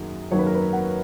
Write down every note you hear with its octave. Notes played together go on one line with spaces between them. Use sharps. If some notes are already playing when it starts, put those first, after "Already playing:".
Already playing: F#2 D#3 F#3 A#3 G#4
F#2 D#3 F#3 A#3 C#5
B4
A#4
B4
F#5